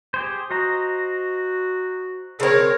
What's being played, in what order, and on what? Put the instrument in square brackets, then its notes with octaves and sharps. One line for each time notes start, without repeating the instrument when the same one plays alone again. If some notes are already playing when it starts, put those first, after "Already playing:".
[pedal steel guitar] G4 G#4 C5
[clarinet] F#4 [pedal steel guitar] C5 D#5 A#5
[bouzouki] C#3 C4 [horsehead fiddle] A#4 C#5